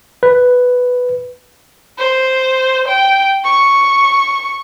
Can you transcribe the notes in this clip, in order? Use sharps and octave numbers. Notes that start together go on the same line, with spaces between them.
B4
C5
G5
C#6